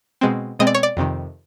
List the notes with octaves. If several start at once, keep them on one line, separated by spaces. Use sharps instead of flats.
B2 G#3 C4
B2 G#3 C4 D#5
D5
C#5
D5
F2 C3 D#3